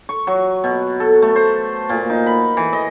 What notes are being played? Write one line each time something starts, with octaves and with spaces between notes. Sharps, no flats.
C#6
F#3
B2
A4
A3
C5
A#2
D#4
B5
E3
D#5